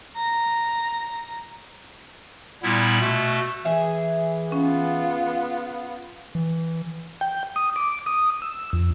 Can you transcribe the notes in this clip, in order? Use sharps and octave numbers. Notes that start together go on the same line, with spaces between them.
A#5
A#2 G3 B3 E4
B2 A3
E3 G#4 E5
B3 C#4 F4
E3
G5
D#6
D6
D#6
E6
F2